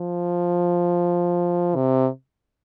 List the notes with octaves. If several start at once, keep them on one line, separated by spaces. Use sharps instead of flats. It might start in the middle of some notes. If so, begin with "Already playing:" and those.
Already playing: F3
C3